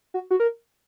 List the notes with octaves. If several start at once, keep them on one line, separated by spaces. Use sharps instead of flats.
F#4
F#4
A#4